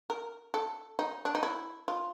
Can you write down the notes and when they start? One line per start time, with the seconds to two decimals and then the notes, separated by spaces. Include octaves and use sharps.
0.10 A#4
0.54 A4
0.99 D#4
1.25 D4
1.35 D#4
1.43 E4
1.88 F4